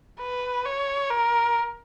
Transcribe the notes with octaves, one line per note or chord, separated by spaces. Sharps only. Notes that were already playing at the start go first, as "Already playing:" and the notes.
B4
C#5
A#4